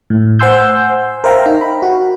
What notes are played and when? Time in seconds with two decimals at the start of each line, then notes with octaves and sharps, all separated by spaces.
0.10 A2
0.39 C5 F#5 G#5 C6 E6 G6
1.24 A#4 C5 E5 F5 G5 A#5
1.46 D#4
1.61 B5
1.82 F#4